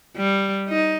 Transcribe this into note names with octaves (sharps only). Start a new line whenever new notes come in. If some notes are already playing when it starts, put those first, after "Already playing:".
G3
D#4